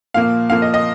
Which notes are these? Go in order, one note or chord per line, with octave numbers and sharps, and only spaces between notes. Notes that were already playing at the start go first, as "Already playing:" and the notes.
A#2 F3 A#3 F5
A#2 F3 A#3 F5
D#5
D#5